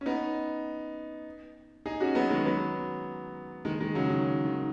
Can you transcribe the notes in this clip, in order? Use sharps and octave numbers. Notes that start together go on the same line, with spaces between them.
C#4
B3 D#4
D#4 G#4
C#4 F#4
F#3 B3
D#3 G#3
F#3 B3
D#3 G#3
D#3 G#3
C#3 F#3
D#3
D#3